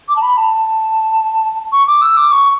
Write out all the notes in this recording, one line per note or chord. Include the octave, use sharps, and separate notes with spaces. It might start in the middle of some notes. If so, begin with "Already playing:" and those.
D6
A5
B5
A5
C#6
D6
E6
D6
C#6